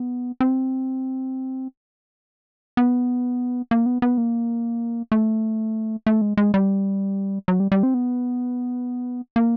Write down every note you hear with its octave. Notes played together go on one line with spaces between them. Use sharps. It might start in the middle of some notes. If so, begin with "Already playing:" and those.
Already playing: B3
C4
B3
A#3
B3
B3
A#3
A3
A3
G#3
G#3
G3
F#3
G3
G3
C4
B3
A#3